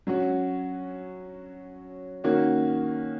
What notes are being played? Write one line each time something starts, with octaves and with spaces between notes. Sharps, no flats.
F#3 C#4 F#4
D#3 A#3 C#4 F#4